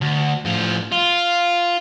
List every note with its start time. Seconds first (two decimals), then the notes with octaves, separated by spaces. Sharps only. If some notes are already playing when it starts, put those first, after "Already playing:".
0.02 D2
0.45 A2 F3
0.92 F4